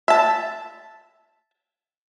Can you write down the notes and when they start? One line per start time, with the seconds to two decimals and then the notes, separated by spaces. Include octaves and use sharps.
0.08 E5 A5